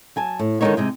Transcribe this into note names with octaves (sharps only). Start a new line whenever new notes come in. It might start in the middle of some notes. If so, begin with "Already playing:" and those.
F#3 G#5 A5
A2
D3 D#3 G#3 C4 D#4 C#5
C3 G#3 D#4